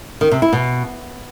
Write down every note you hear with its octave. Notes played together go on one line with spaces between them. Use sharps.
D#3
C3
E4
B2